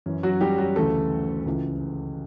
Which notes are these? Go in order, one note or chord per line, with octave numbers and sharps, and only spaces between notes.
F#2 E3 C#4
F#3 F#4
G3 G4
F#3 F#4
D2 C#3 E3 A3 A4
C#2 C#3 E3